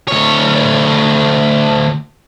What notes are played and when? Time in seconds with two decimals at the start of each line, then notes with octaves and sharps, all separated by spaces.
0.08 D2 C#5